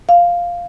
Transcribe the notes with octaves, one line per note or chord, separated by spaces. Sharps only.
F5